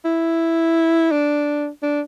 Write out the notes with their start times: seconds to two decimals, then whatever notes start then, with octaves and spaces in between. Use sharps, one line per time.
0.05 E4
1.12 D4
1.82 D4